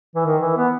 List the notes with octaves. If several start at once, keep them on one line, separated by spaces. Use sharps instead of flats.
E3
D#3
E3
B3